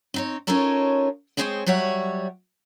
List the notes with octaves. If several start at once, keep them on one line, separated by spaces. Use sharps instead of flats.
C4 D#4 C#5
C#4 D#4 F4 A4 A#4 C#5
G#3 C4 G#4 C5 C#5 G5
F#3 G3 C#5 E5 F#5